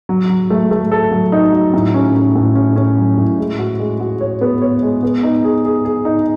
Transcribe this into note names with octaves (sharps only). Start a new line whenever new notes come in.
F#3
F#3
A3
A3
A4
F#3
D#4
F#3
A2
C#4
C#4
A2
C#4
C#4
F#3
A2
G#3
F#4
G#3
F#4
C#5
B3
C#5
G#3
B3
D#4
G#4
G#4
G#4
D#4